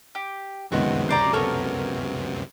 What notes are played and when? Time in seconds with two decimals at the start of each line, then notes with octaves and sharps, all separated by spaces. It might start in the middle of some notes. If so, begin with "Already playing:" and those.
0.15 G4
0.72 C#2 F#2 C3 D#3 G#3 B3 F#4
1.09 C5 D5 A#5
1.33 B3 A4 A#4 C#5